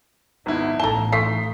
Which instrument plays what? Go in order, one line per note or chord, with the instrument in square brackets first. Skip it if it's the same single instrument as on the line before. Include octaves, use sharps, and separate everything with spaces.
[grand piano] G#1 B3 E4 [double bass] D#4
[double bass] A1 [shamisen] A4 A5 [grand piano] A#5 G7
[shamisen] A3 D#4 F4 [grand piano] B6 C7